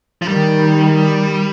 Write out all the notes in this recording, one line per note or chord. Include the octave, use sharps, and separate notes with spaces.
F3
D#3 G3